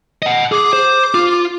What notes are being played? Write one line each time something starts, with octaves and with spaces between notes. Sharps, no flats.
D#5 F#5
G#4 D6
C5
F4